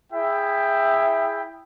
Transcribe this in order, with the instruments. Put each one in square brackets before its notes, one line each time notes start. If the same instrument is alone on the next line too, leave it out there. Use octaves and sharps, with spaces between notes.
[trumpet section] E4 G#4 E5 G5